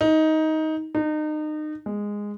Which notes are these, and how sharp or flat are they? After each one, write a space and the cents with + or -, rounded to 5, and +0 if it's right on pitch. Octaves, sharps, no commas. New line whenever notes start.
D#4 +15
D#4 -30
G#3 -10